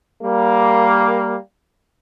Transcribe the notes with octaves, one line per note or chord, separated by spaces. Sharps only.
G3 A#3